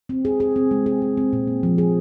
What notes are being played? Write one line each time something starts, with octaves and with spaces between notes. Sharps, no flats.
C4
G#4
G#4
C4
G#3
G#4
G#3
C4
A#2
A#3
F3
G#4